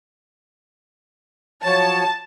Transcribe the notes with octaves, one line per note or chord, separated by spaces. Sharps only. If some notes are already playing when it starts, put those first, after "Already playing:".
F3 F#3 C#5 A5